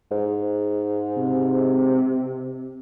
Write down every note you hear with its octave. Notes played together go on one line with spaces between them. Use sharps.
G#2
C3